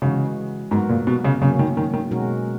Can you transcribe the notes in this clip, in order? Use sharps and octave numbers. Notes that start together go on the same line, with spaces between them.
C#3 E3 G#3 D#4 F#4
G#2 F#3 B3 F#4 A#4
A#2
B2
C#3
C#3 F#3 A#3 C#4
D#3
D#3
D#3
B2 G#3 C#4 F#4 A#4